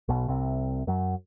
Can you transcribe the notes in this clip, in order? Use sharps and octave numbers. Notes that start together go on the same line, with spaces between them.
B1 B2
C2 C3
F#2 F#3